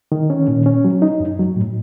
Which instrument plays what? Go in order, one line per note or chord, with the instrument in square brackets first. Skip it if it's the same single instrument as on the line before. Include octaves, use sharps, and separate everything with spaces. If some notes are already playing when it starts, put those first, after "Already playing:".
[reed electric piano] D#3
C#4
A#2
C#4
F#3
D#4
F#2
F#3
A2